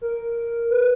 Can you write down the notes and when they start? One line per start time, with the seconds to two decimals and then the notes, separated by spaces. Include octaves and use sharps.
0.01 A#4
0.70 B4